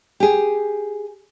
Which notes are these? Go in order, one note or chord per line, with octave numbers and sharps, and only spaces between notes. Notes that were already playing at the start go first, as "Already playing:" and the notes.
G4 G#4